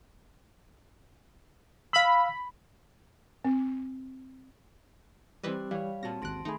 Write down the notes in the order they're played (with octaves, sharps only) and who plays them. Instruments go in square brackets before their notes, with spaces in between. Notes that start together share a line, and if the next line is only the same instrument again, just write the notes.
[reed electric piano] F5 E6 [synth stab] B5
[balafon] C4
[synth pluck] E3 B4 D#5 [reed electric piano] G3 C4 [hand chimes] G4 D6 F#6
[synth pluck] E3 [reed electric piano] G3 C#5 [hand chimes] F5
[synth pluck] A#2 A#6 [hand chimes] C4 F#4 A5
[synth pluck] A1 F#6 [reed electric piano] D#2 G#2 [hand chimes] C6 A#6 D7
[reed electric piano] D#3 A3 G#4 [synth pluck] D#4 [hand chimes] B5 C6